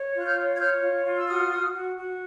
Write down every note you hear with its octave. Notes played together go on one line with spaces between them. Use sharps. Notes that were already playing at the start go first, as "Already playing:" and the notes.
Already playing: C#5
F4
F#6
F6 G6
C#5
G#6
C#5 F6 G6
F4
F4
E6
F#4 D#6 F6
F#4
F#4
F#4